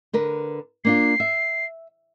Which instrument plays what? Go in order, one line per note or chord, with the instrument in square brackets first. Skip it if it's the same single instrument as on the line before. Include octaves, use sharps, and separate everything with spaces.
[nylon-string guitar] D3 A#4 B4
[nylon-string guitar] A#3 D4 F4 [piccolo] C7
[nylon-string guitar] E5